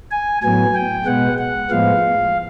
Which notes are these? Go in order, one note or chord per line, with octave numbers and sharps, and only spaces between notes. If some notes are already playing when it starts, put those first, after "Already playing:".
G#5
A2 F#3 B3 G#5
G5
B2 G#3 B3 F#5
F#5
A2 F3 G#3 B3 F5